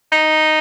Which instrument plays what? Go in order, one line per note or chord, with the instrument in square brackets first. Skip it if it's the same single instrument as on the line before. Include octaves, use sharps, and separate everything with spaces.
[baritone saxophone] D#4